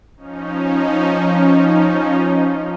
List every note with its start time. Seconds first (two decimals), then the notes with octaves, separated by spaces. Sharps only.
0.16 F3 C#4 D#4